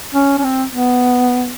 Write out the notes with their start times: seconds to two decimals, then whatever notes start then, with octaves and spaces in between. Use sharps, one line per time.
0.14 C#4
0.38 C#4
0.44 C4
0.72 B3